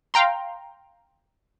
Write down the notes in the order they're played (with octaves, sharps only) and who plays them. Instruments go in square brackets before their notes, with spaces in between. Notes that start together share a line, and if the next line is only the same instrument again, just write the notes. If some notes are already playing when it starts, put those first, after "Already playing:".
[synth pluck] F5 G5 A#5 C6